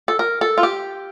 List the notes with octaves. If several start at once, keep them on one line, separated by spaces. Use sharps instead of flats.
A4
A#4
A4
F4
G4